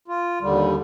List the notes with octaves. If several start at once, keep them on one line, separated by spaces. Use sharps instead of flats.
F4
D#2 D3 G3